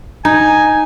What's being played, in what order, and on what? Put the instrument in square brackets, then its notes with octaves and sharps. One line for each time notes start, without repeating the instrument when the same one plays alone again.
[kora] D#4 [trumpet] G#5